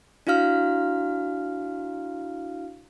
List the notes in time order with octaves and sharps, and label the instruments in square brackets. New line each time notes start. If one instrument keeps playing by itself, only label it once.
[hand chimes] D4 E4 F#4 F5 F6